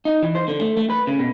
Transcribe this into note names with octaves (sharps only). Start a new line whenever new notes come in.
D#4
E3
C5
D3
A3
A3
B4
C#3
B2